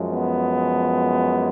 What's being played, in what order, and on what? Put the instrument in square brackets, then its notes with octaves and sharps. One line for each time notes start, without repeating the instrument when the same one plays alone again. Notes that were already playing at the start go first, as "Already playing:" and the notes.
Already playing: [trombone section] F#2 F3 G#3
B3